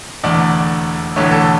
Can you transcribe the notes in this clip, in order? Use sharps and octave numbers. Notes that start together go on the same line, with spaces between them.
E1 E2 D3 A3 D5
E1 E2 D3 A3 C#5
A4